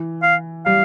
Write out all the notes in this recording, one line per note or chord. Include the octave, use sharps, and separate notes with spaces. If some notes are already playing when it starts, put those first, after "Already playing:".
Already playing: E3
F5
G3 F5